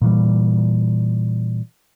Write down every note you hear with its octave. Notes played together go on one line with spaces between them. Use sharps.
A#2 E3 G3